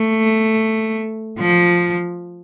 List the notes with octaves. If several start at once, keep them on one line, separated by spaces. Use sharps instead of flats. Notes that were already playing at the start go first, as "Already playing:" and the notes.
Already playing: A3
F3